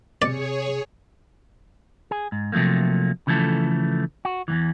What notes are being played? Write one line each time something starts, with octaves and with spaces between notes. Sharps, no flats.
C3 G#4 C#5 D5 C#7
G#4
G#2
C3 F3 F#3 A3 A#3
C#3 E3 F3 A3 A4
F#4
E2 G#2 E3